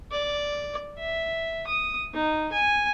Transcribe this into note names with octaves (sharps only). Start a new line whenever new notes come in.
D5
E5
D#6
D#4
G#5